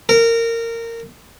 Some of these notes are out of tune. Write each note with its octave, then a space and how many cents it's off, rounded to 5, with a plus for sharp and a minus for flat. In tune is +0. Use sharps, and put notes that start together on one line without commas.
A#4 -20